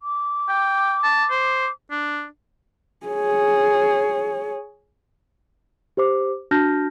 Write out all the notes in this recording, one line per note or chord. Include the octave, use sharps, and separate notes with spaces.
D6
G5
A5
C5
D4
G#4 C#5
G4 C5 D6
D4 F#4 A5 F6 G6 A#6